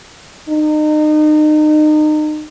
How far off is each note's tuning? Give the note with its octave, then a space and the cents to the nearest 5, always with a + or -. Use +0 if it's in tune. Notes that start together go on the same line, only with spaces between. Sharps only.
D#4 -30